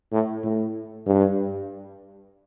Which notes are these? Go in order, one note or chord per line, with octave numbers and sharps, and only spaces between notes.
A2
A2
G2